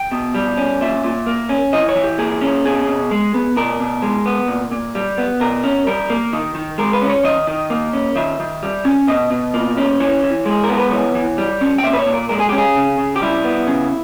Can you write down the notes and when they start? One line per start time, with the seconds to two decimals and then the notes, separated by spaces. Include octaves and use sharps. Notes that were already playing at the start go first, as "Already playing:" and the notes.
Already playing: G5
0.11 B2
0.34 G3
0.57 C#4
0.81 A#2 E5
1.04 A#2
1.27 A#3
1.49 C#4
1.73 E3 D#5
1.89 C#5
1.96 E3
2.04 G4
2.18 A#3 G#4
2.41 C#4
2.65 B2 G#4
2.87 B2
3.11 G#3
3.34 B3
3.56 B2 A#4
3.80 B2
4.02 G#3
4.26 B3
4.48 A#2
4.72 A#2
4.95 G3
5.18 B3
5.40 B2 A#4
5.64 C#4
5.87 G3 A#4
6.10 A#3
6.33 D#3
6.55 D#3
6.78 G#3 A#4
6.93 B4
7.02 C#4
7.10 C#5
7.24 D#3 D#5
7.47 D#3
7.70 A#3
7.93 C#4
8.16 D#3 E5
8.40 D#3
8.63 G3
8.85 C#4
9.07 B2 D#5
9.30 B2
9.54 A#3
9.77 C#4
10.00 E3 C#5
10.24 E3
10.46 G#3 G#4
10.64 A#4
10.69 B3
10.78 B4
10.91 E3 C#5
11.15 E3
11.38 G3
11.61 C#4
11.78 G5
11.83 A#2 E5
11.93 B4
11.99 C#5
12.06 A#2
12.14 A#4
12.29 G#3 A#4
12.39 G#4
12.49 C#4 G4
12.58 G#4
12.76 C#3
12.98 C#3
13.16 G4
13.22 G3 E4
13.44 B3
13.67 C#3